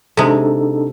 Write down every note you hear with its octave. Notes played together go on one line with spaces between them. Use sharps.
C3 G#3 D4 D#4 A4